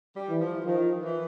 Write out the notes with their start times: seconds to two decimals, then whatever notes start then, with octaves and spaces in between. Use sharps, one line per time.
0.16 G3
0.30 E3
0.41 F3
0.65 D#3 F3
1.02 E3